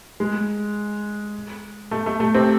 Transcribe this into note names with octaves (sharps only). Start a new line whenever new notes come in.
G#3
A3
A3
A3
C3 C4